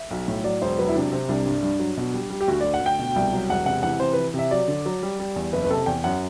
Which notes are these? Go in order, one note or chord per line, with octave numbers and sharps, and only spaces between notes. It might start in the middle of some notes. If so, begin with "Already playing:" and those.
Already playing: E5
B1
A2
F#3 D5
E1 C5
F#3 B4
E4
C3 D4
C3 C4
C2 D4
G2
G2
F#3
B2
G3
G3
G4
D2 F#4
D2 D5
F#5
D2 G5
B2
C2
F#3
E1 F#5
C3 F#5
E3 F#5
C3 C5
E3 B4
C3 E5
F#3 D5
D3
F#3
G3
G3
E2
F#1 B4
B4
C3 A4
E2 G5
F#2 F#5